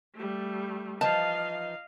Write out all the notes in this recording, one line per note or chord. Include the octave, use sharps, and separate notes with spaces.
G3 A3
E3 F3 D#4 D#5 F5 A5